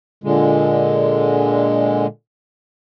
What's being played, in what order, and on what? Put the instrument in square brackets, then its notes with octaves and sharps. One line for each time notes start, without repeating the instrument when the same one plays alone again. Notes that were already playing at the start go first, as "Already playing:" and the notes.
[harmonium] A#2 D3 G#3